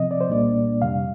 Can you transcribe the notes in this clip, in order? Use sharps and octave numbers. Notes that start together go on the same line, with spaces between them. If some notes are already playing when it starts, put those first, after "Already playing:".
Already playing: C3 F3 C4 D#5
D5
C5
C2 A#2 G3 A#3 D4 D5
F2 C3 G3 F5